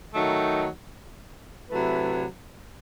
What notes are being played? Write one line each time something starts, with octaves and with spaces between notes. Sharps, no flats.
D#3 F#3 A3 D#4
C3 F#3 A3 E4 B4